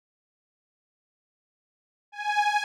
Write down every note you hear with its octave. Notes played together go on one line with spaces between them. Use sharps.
G#5